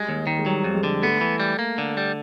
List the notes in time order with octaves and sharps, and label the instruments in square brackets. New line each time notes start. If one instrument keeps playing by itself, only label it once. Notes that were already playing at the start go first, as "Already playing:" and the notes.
Already playing: [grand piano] G3 [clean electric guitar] G#3
[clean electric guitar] D#2
D#3
[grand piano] G#3
[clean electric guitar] F#3 [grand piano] G3
[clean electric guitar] F2
[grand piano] G#3
[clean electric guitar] D3
[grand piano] A3 [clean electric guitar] B3
[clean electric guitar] E3
G3
A#3
D3
G3